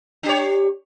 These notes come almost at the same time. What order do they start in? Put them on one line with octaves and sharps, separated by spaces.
D4 G4 C#5